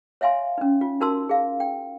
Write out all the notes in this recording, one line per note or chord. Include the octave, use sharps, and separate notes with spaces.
C#5 E5 F5 G#5 C6
C#4 D#4
F4
D#4 F#4 A#4 A5 C6 E6
G#4 F5
G5